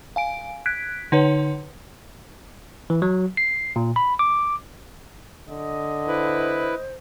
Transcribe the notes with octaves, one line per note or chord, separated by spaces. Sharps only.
F5 G#5 D7
F#6 G#6 B6 D7
D3 D#4 B4 C#5
E3
F#3
C7
A#2
B5
D6
D3 D#5
E4 B4 C5